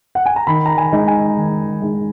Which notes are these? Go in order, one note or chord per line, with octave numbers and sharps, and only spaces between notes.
F#5
G#5
A#5
D#3 B5
A#5
G#5
G#3 D#4
G#5
D#3
G#3 D#4